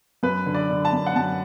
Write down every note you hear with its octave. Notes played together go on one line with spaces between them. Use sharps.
F#2 B4
D3
D5
D3
A5
F#2
F#5
F#2 A5